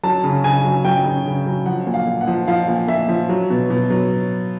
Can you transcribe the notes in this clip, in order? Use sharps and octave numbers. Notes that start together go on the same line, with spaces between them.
F#3 A5
C#3
C#3 G#5
F#3
F#3 G5
C#3
C#3
F#3
F3 F#5
A#2
F5
A#2
F#5
F3
F3 F5
A#2
A#2 E5
F3
F#3
B2
B2
F#3